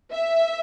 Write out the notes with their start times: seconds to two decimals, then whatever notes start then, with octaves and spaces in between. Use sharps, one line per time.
0.13 E5